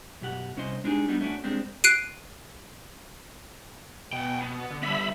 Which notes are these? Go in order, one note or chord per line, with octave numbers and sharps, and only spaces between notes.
F#2 B2 G4 F#5
C2 C#4 C5 D#5 C6
G#3 D4 D#4 G4 G#4
G3 B3 D4 D#4 F#4
A3 C#4 D4 F#4
G#3 C4 D4 G4
F#6 C7 D7 D#7
B2 F#5 G5
B3
D3
G3 B3 E5 B5